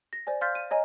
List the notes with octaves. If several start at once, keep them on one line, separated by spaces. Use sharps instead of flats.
A#6
C5 D5 G#5
F5 C6 F6 G6 A6 B6
D#7
C#5 D#5 G#5 A#5